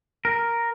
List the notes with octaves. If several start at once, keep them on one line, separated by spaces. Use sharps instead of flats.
A#4